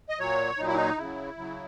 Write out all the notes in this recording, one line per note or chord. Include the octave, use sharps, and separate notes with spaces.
D#5
A#2 F#3 C#5
A#2 F#3 D#4
E4
D#4
C#3 F#3 E4
C#3 F#3